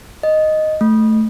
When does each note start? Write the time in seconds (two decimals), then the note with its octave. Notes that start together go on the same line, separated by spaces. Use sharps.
0.23 D#5
0.81 A3